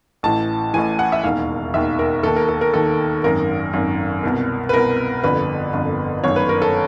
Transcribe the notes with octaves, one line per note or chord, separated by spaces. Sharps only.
A1 A2 E3 A5
A1 A2 E3 G#5
F#5
E5
E1 D#2 D#3 F5
E1 D#2 D#3 E5
A#4
D#2 D#3 A4
A#4
A4
A#4
D#2 D#3 A4
G#1 F#2 D#3 A#4
G#1 F#2 D#3
C2 B2
B4
C2 B2 A#4
G1 F2 D3 B4
G1 F2 D3
G1 F#2 D#3 C#5
B4
A#4
A4